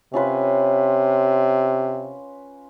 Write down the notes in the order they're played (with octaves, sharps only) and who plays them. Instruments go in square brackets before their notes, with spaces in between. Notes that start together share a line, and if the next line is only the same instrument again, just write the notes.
[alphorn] C3 [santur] C#4 F4 B4